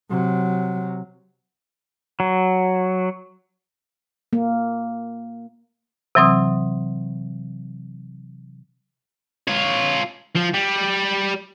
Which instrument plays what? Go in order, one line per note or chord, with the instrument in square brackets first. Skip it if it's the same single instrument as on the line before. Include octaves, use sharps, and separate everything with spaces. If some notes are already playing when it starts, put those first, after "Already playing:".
[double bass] C3 F#3
[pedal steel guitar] F#3
[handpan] A#3
[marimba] C3 E3 F#3 C4 D#6
[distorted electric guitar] F4 C#5
F3
G3